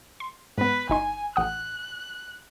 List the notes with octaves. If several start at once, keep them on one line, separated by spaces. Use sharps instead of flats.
C6
G#2 B3 B4
G1 D#4 G#5 C6
A1 F#5 D#6 F#6